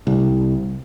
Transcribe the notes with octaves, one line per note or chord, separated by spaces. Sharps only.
C2